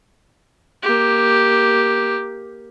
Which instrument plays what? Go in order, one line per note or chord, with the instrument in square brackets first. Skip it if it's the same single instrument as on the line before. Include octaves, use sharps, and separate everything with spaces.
[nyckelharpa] A#3 G4